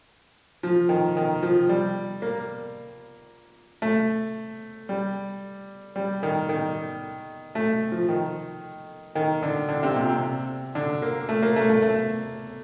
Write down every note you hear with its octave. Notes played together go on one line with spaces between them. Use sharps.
F3
D#3
D#3
F3
G3
A#3
A3
G3
G3
D#3
D#3
A3
F3
D#3
D#3
D3
D3
C3
A#2
C3
D3
A#3
A3
A#3
A3
A3
A3